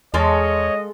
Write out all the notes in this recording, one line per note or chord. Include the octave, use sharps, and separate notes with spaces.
E2 G#3 A4 C#5 D#5 F5